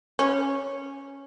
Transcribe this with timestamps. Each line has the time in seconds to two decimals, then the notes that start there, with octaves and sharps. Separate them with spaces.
0.19 C#4